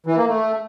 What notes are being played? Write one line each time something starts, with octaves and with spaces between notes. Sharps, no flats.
E3
A#3
A3